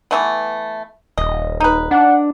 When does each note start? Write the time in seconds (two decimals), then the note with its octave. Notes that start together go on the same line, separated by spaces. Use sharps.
0.11 E3 A3 B3
1.18 D#1 D#5
1.60 D#4 B4
1.91 D4 F#5